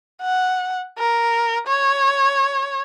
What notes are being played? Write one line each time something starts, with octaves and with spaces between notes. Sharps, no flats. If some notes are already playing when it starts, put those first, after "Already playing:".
F#5
A#4
C#5